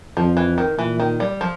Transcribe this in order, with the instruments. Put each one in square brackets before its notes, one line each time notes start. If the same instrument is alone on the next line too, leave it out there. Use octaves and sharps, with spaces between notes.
[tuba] F2 [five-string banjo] F3
[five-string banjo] E3
D#3
[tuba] A#2 [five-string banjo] E3
[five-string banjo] D#3
G3
F3